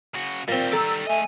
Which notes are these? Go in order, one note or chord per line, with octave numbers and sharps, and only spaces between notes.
C#3 F#4
A#2 D#3 G3 C4
A4 A#5 D6 E6
A3 D#5 E5 G#5